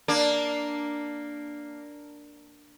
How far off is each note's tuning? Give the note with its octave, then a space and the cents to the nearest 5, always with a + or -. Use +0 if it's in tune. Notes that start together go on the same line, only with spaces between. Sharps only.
A#3 +0 D4 +0